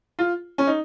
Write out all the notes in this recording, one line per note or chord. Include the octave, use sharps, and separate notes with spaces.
F4
C#4
D#4